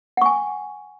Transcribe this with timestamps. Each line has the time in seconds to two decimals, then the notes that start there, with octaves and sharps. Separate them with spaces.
0.17 F#5
0.22 C#6
0.26 G#5